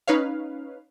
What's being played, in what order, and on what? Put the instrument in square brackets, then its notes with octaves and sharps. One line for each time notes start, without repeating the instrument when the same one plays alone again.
[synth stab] C#4 D#4 B4 C#5 F5